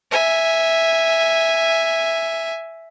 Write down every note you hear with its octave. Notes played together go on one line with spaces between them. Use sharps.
E5 G#5